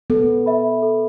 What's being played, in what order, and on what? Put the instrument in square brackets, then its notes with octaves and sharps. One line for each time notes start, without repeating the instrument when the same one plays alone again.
[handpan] B3 [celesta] A4
[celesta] E5 B5
A4